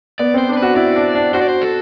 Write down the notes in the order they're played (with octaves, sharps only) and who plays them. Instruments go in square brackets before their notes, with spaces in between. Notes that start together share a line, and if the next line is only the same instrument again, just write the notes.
[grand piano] B3 [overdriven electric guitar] D5
[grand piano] C4 [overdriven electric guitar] C5
[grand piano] D4 [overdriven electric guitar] C5
[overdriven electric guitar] B4
[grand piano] F#4
[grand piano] E4 [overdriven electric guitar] D5
[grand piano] D4
D4
[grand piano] F#4 [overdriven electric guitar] C5
[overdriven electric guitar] D5
C5
A4